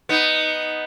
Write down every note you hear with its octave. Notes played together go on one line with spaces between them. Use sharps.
B3 D#4